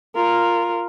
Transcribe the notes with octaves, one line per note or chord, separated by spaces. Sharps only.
F4 A#4